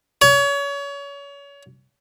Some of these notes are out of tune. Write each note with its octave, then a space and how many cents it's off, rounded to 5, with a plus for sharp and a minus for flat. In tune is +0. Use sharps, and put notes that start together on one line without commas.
C#5 +30